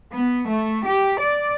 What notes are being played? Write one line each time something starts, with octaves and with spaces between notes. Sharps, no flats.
B3
A3
G4
D5